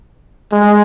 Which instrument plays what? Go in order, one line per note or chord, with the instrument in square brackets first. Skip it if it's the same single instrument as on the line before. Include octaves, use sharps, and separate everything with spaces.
[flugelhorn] G#3